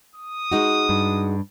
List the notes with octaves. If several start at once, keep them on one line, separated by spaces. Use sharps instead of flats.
D#6
G#3 D#4 F#4
G2